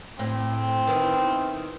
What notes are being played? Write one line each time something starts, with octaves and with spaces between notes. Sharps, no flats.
A2 C4
D#3 B3 E4